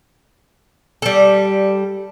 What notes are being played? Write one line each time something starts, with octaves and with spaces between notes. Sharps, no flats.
G3 A4